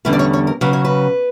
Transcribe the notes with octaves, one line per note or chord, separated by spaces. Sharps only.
E2 D3 G3 C#4 B4
D5
C#5
C#5
A#4
C#3 F#3 C#4 B4
C#5
B4